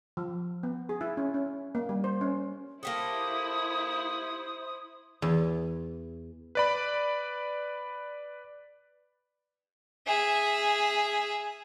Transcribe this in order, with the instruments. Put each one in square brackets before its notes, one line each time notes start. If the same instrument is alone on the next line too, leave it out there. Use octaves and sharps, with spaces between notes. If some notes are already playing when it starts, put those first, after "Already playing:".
[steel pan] F3
B3
G#4
E4
C#4
C#4
A#3
G3
C5
C#4
[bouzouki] A#3 G4 A4 [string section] E4 [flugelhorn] C5 [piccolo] D#6
[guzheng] E2
[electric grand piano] B4 D5 B5
[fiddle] G#4 E5